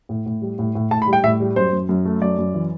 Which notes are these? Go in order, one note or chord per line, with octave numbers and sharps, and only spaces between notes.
A2
A2
G3
A2
A2
A2 A5
B5
G3
G5
A2 E5
G3
F#2 C5
F#2
F#2
A3
F#2 D5
F#2
E3